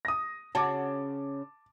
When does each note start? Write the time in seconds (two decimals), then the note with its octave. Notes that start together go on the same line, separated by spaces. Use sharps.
0.05 D#6 A#6
0.55 C#3 C#4 F#4 A5 D6